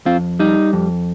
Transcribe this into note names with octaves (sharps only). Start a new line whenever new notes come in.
F2 C4 F4
G3 D#4
F2